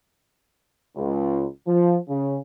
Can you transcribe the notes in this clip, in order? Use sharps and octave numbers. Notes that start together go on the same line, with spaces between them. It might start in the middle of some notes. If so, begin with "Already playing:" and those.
C#2
F3
C#3